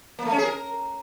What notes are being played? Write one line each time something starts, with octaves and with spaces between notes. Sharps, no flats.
A#3
A3
C#4
G#4
A#4